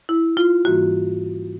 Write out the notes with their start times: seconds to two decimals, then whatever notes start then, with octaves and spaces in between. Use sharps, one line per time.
0.09 E4
0.37 F4
0.65 G#2 E3 G3 A#3 F#4